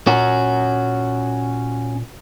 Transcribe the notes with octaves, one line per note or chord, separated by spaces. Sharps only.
A#2 C#4 F#4